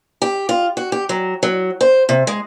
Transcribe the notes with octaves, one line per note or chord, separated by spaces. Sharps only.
G4
F4
F#4
G4
F#3
F#3
C5
C3
G#3